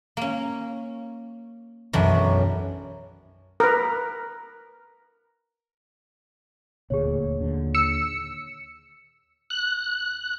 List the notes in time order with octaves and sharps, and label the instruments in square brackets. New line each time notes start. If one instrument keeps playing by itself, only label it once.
[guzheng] A#3 C#4
[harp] B1 F#2 F#3 [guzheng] D#3 E3 D4
[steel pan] A#4 B4
[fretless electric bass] D#1 D2 A#2 [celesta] G#4 C#5
[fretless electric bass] D#2 A#2 D3
[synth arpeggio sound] E6 C#7
[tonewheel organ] F#6